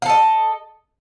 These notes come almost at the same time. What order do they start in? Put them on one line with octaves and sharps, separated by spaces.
F5 A4 D#5